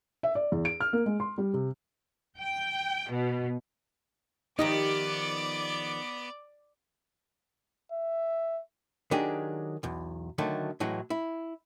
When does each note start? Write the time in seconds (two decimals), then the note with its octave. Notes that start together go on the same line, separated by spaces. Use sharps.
0.23 E5
0.35 D5
0.52 E2
0.65 D7
0.80 F6
0.93 A#3
1.06 G#3
1.20 C6
1.38 G3
1.54 C3
2.41 G5
3.11 B2
4.59 D#3 F3 B3 D#4 G4 D5 D#5 D6
7.92 E5
9.11 D#3 F#3 D4 G4 G#4
9.83 B1 E2
10.38 D3 D#3 F#3 A3
10.80 A2 E3 F#3 G#3
11.10 E4